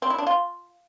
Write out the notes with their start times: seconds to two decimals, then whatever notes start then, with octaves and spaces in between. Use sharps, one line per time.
0.02 C4
0.10 E4
0.18 D4
0.27 F4